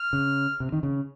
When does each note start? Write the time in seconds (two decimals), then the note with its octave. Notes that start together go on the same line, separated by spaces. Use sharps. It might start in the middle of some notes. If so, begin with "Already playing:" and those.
Already playing: F6
0.13 C#3
0.60 C3
0.72 D#3
0.83 C#3